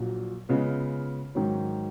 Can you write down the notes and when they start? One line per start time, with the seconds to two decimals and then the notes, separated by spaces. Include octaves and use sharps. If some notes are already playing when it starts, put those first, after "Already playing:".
Already playing: A#1 A#2 F#3
0.49 C#3 G#3 B3 F4 G#4
1.35 G#2 D#3 F#3 C#4